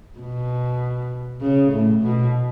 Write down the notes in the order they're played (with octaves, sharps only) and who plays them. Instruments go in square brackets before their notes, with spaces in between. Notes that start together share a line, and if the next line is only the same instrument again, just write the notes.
[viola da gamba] B2
C#3
A2
B2